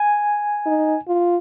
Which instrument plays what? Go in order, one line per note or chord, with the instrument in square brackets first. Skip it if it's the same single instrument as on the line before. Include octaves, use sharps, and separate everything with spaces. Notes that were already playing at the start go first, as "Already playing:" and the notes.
Already playing: [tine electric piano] G#5
[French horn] D#4
F4